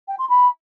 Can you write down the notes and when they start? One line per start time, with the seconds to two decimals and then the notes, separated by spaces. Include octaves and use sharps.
0.08 G5
0.18 C6
0.29 B5